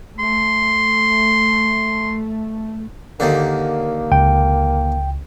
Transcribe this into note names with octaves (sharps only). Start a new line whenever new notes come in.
A3 C6
D#2 D3 A#3
C#2 G5